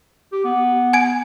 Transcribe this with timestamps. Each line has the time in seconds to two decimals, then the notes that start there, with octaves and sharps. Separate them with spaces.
0.32 G4
0.45 B3
0.93 G#5 G#6 D7